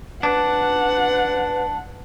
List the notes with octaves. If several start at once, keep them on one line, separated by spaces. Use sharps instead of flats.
D4 B4 F#5